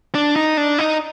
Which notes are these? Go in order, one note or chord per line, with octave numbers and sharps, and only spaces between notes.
D4
D#4
D4
D#4